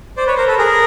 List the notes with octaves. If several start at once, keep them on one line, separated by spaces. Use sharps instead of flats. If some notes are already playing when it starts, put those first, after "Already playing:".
C5 D5
B4 C#5
A#4 C5
A4 B4
G#4 A#4